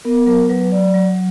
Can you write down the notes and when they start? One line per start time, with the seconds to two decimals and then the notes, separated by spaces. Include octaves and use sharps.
0.05 B3 A#4
0.26 F#3 A#4
0.49 F#3 B4
0.72 F#3 D5
0.94 F#3